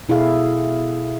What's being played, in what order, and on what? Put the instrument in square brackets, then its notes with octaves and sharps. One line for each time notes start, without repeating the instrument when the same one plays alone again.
[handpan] B2 E4 G#4 A4 F5